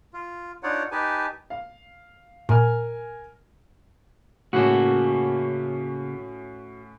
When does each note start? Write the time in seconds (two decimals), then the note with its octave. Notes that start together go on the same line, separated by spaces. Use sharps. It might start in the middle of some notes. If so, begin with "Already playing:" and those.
0.13 F4
0.63 D4 D#4 F4 C#5 D5 F#5
0.91 D#4 G4 B4 G#5 A5
1.50 F5
2.49 A#2 A#4 G#5 F6
4.53 A2 C#3 A#3 C#4 F#4 A4